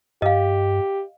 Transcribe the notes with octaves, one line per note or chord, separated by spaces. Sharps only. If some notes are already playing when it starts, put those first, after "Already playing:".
G2 G4 D#5 F5